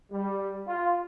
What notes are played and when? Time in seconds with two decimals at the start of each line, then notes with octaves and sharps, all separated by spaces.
0.12 G3
0.67 F4